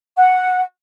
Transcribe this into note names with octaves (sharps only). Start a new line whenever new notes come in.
F#5